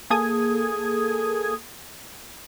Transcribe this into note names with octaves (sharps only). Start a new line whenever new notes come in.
A#3 G#4 A4 D#6 G#6